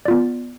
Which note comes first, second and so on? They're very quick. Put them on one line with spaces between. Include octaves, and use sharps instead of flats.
D5 F4 B3